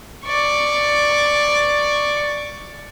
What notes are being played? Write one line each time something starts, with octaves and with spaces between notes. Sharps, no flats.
D5 C#6